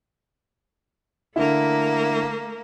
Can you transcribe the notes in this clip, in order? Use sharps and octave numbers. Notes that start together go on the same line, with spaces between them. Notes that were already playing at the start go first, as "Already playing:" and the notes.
D3 A3 A#3 E4